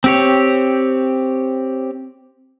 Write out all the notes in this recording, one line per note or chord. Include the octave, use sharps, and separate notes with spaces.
C4 G4 C#5